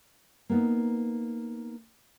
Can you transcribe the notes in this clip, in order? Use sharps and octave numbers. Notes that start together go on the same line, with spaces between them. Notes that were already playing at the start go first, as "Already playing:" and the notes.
A#3 B3 D#4